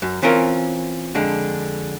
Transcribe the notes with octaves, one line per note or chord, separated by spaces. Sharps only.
F#2
E3 C4 C#4 F4 A#4
F2 D3 G#3